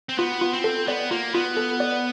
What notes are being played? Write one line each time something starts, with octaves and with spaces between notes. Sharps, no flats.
C4
B3 F4
F4
C4
A4
B3 D5
A#3 F4
B3 F4
A4
D5